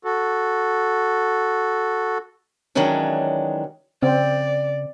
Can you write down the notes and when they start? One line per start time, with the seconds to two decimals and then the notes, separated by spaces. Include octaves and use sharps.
0.04 F#4 A4
2.75 D#3 E3 F#3 G#3 C#4 D4
4.03 C#3 C4 D5